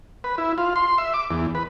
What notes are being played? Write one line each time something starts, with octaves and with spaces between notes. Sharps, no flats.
B4
E4
F4
C6
E5
D6
E2
B4